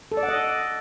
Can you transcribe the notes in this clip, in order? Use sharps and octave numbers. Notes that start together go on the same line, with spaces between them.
A4
D5
F#5
D#5